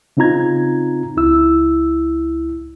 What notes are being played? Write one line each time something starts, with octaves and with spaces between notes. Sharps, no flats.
C#3 C4 D#4 F4 A#5 G#6
C#2 E4 E6